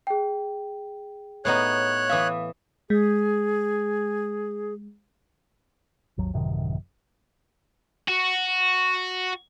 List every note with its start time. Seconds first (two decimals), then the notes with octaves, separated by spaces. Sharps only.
0.07 G#4 G5
1.45 A2 B3 D#4 C#5 F#6
2.09 E3 E5 F5 D#6
2.90 G#3 G#4
6.18 G#1 D#2 F#3
6.33 A1 F#2 C3 D#3
8.08 F#4